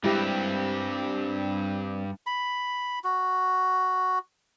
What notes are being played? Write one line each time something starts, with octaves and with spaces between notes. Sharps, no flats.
G2 G3 G#3 C4 E4 G4
B5
F#4